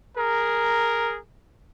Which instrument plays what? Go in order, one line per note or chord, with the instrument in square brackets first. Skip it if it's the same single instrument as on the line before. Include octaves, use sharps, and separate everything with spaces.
[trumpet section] G#4 A#4